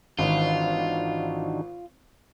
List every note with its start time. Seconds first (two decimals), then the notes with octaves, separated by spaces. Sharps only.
0.19 G#1 D#3 E3 D4 D#4 F4 F#4